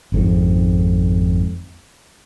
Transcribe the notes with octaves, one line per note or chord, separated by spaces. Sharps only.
G#1 F2 G#2